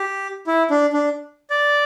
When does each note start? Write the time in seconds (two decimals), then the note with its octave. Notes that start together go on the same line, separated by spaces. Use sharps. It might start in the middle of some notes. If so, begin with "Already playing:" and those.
Already playing: G4
0.47 E4
0.70 D4
0.93 D4
1.50 D5